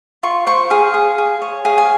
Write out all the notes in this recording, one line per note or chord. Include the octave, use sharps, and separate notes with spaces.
F4 C#6
C5 C#6
G#4 F5
G#4
G#4
C#5
G#4 F5
G#5